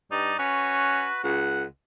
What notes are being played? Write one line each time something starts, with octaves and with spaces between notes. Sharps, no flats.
G2 D#4 D5
C#4 F#4 B4
C#2 F#5